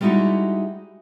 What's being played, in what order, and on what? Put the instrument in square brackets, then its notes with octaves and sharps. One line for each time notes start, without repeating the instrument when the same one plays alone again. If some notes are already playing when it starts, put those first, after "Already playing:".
[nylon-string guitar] G3 G#3 D#4 E4 F#4 G4